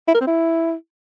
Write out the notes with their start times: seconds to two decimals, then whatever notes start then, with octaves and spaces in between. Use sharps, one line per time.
0.08 E4
0.14 A#4
0.21 C4
0.27 E4